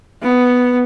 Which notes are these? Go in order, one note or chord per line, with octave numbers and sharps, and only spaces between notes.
B3